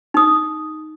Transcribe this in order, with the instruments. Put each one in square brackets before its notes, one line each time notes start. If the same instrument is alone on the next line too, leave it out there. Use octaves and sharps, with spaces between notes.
[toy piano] D#4 D#6